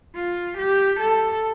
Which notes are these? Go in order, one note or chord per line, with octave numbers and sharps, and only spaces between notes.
F4
G4
A4